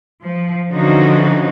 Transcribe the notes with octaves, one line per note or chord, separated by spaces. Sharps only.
F3
D3 E3 F3 C#4 D#4 F#4